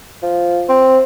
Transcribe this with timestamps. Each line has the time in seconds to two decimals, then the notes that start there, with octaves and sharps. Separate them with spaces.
0.23 F3
0.69 C4